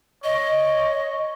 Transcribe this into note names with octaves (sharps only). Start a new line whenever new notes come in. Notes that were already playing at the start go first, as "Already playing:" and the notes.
C#5 D#5